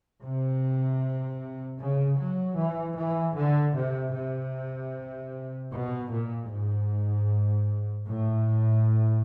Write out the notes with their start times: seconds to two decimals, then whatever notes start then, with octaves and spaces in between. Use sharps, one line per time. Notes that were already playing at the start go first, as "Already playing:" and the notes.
0.23 C3
1.80 C#3
2.19 F#3
2.58 E3
2.97 E3
3.37 D3
3.76 C3
4.15 C3
5.72 B2
6.11 A#2
6.50 G#2
8.07 A2